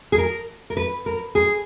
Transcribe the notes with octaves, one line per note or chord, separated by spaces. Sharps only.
G#4
A#4
A#4
B4
A#4
G#4